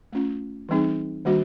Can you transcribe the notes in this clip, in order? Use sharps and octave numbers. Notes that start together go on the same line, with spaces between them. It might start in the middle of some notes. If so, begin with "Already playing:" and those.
A3 C#4 F4
E3 G3 C4 D#4 G#4
D#3 G3 A#3 D4 F#4